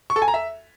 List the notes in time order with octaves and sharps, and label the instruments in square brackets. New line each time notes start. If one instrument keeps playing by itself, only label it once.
[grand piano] C#6
A4
G#5
A#5
E5